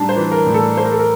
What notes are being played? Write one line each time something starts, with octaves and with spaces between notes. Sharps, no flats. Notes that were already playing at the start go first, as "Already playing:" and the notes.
Already playing: A2 G3 D4 A5 A#5
C5
E3
A#4
A2
A4
A3 C5
A#4
A4
A#4